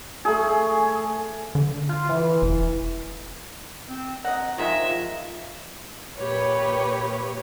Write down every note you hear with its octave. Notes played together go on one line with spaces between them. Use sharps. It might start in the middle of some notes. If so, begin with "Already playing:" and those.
A3 G#4
D3
F4
E3
F1
C4
D#5 F#5 A#5
D#3 F3 G#3 F4 E5
A#2 G4 B4 C#5